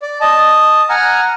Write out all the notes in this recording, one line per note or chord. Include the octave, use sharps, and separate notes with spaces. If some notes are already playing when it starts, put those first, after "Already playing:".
D5
D#5 A5
F#5 G#5 A#5 F6